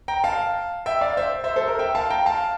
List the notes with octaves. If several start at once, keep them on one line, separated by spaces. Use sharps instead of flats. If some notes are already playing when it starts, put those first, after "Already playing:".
G5 A#5
F5 A5
E5 G5
D5 F5
C5 E5
C5 E5
A4 C5
A#4
E5 G5
F5 A5
G5 A#5
F5 A5